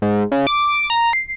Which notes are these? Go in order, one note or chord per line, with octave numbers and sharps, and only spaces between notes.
G#2
C#3
D6
A#5
C7